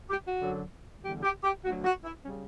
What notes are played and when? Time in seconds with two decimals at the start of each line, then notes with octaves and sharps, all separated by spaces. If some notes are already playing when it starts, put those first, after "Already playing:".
0.10 G4
0.24 F#4
0.40 F#2 D3 F#3
1.02 E2 D3 G3 G4
1.23 G4
1.43 G4
1.63 D2 D3 F#3 F#4
1.84 F#4
2.04 E4
2.24 C#3 G3 C#4